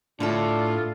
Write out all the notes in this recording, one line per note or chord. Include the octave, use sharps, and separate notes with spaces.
A2 D3 A3 D4 F4 A4